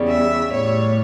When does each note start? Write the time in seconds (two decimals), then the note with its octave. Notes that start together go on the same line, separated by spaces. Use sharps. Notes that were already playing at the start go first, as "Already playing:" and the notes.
Already playing: E2 C#3 G3
0.08 E5
0.52 A2 G3 C#5